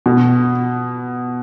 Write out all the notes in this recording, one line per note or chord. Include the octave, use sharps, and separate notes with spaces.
B2